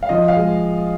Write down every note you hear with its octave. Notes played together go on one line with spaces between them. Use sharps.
F5
F3 D#5
F5
G#3